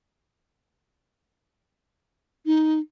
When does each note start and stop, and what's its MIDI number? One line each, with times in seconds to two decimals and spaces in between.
2.46 2.80 63